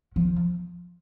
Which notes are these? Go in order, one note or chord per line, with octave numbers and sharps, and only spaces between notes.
F3